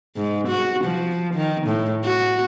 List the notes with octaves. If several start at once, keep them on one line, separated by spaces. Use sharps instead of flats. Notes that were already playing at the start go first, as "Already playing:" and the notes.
G#2
F#4
F3
D#3
A2
F#4